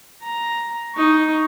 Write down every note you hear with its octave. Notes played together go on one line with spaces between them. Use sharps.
A#5
D#4 C#6